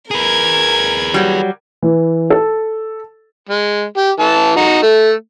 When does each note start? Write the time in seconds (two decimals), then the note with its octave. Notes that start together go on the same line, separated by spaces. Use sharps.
0.11 G#4 A#4 B4 G#6
1.14 F#3 G3
1.82 E3
2.30 A4
3.49 G#3
3.97 G4
4.20 E3 A5
4.56 D#4 F#4
4.82 A3